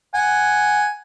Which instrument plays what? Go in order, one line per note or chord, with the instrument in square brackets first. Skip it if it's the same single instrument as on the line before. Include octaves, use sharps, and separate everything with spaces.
[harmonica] F#5 G#5